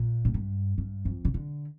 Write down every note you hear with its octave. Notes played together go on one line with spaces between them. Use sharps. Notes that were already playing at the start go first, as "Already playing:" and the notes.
Already playing: A#2
A2
G2
G2
F2
C#3
D3